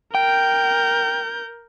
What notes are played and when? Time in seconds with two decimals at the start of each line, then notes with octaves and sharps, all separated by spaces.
0.15 A#4 G5 G6